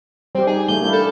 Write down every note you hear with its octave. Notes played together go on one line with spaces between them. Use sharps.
G3 C4 G4
D#4 G#4
G3 A3 G6
A#3 D4 E4
A4